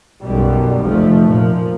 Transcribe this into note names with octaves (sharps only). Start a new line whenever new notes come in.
B1 F#2 B2 G3
F1 D2 F3 A3
A#2 F3